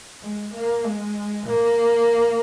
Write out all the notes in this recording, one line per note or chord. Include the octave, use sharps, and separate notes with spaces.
G#3
A#3
G#3
A#3